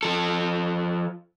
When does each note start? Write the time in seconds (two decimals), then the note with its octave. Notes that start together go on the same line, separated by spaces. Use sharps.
0.03 F3 A4